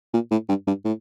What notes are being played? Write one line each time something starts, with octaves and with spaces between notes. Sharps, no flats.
A#2
A2
G2
G2
A2